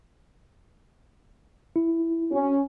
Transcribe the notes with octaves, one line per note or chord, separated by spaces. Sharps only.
E4
C#4 F#4